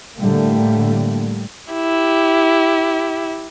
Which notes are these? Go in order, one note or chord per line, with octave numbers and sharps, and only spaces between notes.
A2 D3 G3 A3 A#3
E4 G4